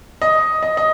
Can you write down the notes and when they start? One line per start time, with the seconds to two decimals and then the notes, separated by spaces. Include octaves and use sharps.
0.22 D#5
0.63 D#5
0.77 D#5